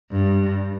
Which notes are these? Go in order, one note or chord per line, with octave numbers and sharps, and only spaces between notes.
G2